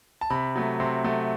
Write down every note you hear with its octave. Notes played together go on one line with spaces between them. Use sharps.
A5
C3 B5
F#3 A3
C3 C6
F#3 A3